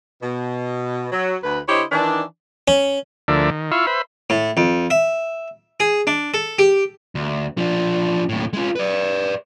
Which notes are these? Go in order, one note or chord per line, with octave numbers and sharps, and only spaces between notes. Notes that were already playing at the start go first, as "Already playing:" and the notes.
B2
F#3
D2 B4
D3 E4 G4 C5 C#5 D#5
D#3 E3 D4
C#4
D2 D3 F3 A#4 D5 E5
D#3
E4 F4 E5 F5 B5 C#6
B4 C5 E5 B5
A2
F2
E5
G#4
D4
A4
G4
D2
F3 D4
D#2 A2
G#3 F4
B4 D5